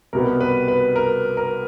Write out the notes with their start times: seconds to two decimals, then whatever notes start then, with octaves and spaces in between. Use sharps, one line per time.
0.13 C2 B2 G3 B3 A#4
0.40 B4
0.68 B4
0.96 A#4
1.37 A#4